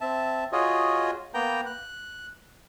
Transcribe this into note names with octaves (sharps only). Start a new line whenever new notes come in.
C4 E5 A5
F4 F#4 G#4 C#5 D#5
A#3 B3 G5 A#5 G6
F#6